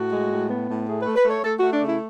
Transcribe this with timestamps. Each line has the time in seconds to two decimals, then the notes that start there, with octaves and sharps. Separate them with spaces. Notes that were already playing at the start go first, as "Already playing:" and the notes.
Already playing: A2 F#4
0.11 G#3
0.30 A2
0.48 B3
0.67 A2
0.87 A3 G#4
1.01 A3 B4
1.16 B4
1.24 A3 C#5
1.43 A3 A4
1.58 A3 F#4
1.72 D4
1.81 C#3
1.86 E4